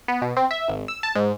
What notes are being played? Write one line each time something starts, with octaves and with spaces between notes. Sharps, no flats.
B3
B2
C4
E5
G#1
E6
A5
G#2